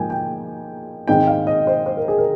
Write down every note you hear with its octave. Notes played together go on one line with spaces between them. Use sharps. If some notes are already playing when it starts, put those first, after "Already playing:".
Already playing: G#2 F3 A#3 G5 G#5
G5
G#2 D#3 G#3 C4 D#4 G5
F5
D#5
C5
C5
A#4
G#4
A#4